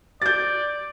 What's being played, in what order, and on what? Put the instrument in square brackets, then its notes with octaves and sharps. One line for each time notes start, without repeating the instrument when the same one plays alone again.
[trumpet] D5 [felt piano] G6 A6